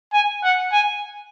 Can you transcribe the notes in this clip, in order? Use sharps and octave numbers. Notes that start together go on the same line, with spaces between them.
G#5
F#5
G#5